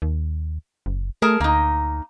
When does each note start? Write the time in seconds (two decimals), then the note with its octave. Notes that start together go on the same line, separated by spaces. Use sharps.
0.02 D#2
0.86 F#1
1.22 A3 G#4 A#4 A5
1.40 D2 A#3 D#4